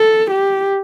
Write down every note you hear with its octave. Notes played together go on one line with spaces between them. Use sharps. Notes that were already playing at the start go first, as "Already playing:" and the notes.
Already playing: A4
G4